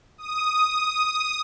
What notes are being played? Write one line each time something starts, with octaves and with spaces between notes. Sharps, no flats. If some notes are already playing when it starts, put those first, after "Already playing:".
D#6